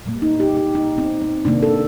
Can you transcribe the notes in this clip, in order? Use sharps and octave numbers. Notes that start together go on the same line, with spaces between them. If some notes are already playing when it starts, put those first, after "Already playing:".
A#2 G3 A#3
D#4
G4
G4
D#4
C4
C4
C3 D#3 A#3 D4
A4